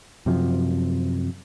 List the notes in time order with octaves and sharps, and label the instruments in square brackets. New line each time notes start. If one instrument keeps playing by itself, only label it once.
[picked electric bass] F#2 C3 F3